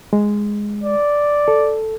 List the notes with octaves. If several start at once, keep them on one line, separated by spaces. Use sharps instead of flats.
G#3
D5
A4